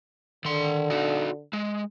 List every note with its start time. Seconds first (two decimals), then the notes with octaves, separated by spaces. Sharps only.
0.45 D3 D#3 C6
0.90 D#4 F#4
1.53 G#3